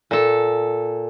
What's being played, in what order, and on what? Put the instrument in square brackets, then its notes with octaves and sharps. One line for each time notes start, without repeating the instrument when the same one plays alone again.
[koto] A#2 A4